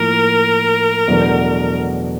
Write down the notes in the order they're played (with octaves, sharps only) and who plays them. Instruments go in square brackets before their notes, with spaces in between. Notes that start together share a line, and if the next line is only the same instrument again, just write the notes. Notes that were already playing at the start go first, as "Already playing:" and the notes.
Already playing: [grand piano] A2 F3 A#3 [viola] A#4
[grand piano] E2 B2 F#3 A3 D4